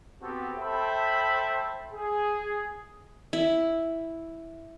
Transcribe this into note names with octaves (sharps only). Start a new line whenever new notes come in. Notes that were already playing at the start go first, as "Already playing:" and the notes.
B3 C4 F#4 G4 A4
A4 C5 E5 G5 A5 B5
G#4
E4